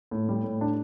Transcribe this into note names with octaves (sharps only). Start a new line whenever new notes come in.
A2
G3
A2
D4